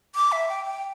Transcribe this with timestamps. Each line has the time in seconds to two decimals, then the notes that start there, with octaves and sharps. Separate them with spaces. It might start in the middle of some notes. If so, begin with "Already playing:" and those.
0.15 D6
0.32 E5
0.49 G5
0.65 G5